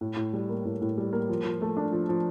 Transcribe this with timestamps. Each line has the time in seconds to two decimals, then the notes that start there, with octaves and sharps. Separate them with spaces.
0.01 A2
0.16 A2
0.33 G3
0.49 A#3
0.65 A2
0.82 A2
0.98 G3
1.13 A#3
1.29 F3
1.44 F3
1.62 A3
1.77 D4
1.92 F3
2.09 F3